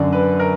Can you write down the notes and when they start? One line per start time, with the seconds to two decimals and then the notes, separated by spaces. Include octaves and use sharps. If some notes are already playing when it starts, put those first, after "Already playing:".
Already playing: F#2 D3 D5
0.12 B4
0.39 A#4